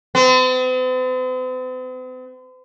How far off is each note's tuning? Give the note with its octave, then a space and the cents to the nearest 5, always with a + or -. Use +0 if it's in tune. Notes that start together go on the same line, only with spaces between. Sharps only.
C4 -45